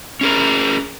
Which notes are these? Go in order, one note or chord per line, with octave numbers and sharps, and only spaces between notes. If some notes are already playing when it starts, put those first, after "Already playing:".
C#4 G#4 A#4